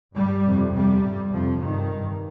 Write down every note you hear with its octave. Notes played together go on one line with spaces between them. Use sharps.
G2 G3
F2 C3
F2 C3 G3
G2
F2 C3 F3
G2 D#3
G2